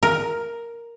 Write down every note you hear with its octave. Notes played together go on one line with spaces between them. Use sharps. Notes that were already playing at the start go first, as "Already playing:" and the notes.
A#4